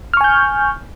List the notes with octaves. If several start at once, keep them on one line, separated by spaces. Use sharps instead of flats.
G#5 C#6 F6 G6